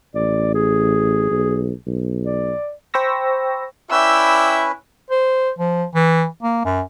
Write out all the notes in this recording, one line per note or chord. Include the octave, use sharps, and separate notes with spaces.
A1 D5
G#4
B1
B1
D5
C5 G5 B5 C#6 E6 A#6
C#4 E4 B4 D5 E5 G5 E6
C5
F3
E3
A#3
F#2